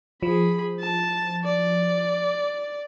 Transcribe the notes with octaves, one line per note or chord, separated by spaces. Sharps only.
F3 G#4 B5
A5
D5